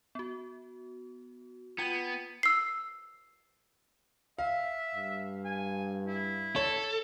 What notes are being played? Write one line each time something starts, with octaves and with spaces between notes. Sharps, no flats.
B3 F#4
B3 F4 G5 G#6
E6 C7
E5 F5
G2
G#5
E4
A4 C#5